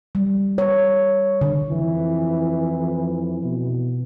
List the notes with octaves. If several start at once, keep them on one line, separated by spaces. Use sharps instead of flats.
G3
C#5
D3
F2 E3
B2